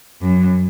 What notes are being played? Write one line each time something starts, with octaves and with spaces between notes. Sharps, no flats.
F#2